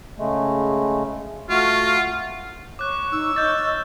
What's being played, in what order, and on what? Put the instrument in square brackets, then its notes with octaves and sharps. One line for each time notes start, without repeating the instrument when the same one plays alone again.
[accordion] C#3 G#3 A3
[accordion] A3 F#4 [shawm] F4
[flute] C#5 [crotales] D6 F#6
[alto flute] D#4 [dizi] E6
[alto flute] D#5 [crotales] F6 G6 A6